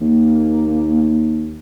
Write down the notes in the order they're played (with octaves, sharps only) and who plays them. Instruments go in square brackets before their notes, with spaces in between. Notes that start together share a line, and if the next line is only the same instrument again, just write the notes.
[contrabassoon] D#2 [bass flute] A#3